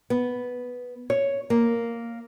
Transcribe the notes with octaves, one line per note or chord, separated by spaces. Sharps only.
B3
C#5
A#3